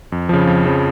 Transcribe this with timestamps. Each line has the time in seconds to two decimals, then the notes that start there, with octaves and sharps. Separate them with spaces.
0.12 F2
0.29 C#3 F3
0.47 F2
0.65 C#3 F3